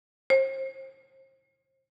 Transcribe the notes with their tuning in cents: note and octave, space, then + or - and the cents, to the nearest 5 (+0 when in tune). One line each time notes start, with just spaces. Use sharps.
C5 +40